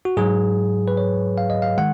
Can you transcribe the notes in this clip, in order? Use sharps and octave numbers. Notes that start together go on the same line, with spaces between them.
F#4
G#2 F#3 G#4
B4
C#5
F5
D#5
F5
D#3 G#3 F#5